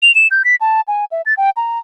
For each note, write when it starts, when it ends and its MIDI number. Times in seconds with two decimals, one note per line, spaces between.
0.02 0.14 101
0.15 0.27 100
0.31 0.42 91
0.44 0.55 95
0.61 0.81 81
0.88 1.05 80
1.11 1.22 76
1.26 1.34 93
1.37 1.50 79
1.57 1.78 82